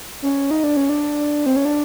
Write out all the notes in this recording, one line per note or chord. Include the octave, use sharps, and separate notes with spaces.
C#4
D#4
D4
C#4
D4
C4
C#4
D4